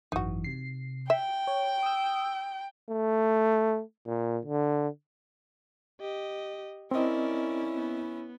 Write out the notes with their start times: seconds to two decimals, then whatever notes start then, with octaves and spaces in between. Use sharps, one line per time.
0.12 G#1 F#2 E3 D#4 F#4
0.44 C3 C7
1.10 E5 G5
1.47 C#5
1.83 D#6 E6
2.90 A3
4.06 A#2
4.46 D3
6.01 G4 D#5
6.91 C4 C#4 E4 A#4 D5 D#5
7.75 B3